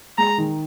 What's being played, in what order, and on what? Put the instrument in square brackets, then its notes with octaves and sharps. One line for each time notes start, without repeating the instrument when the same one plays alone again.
[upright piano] G#3 [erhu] A#5
[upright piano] D#3